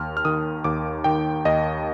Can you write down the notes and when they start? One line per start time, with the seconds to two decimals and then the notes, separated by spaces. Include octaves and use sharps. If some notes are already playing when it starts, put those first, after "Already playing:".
Already playing: D#2 F6
0.17 F6
0.25 D#3 D#6
0.64 D#2 D6
1.04 D#3 G5
1.45 D#2 D#5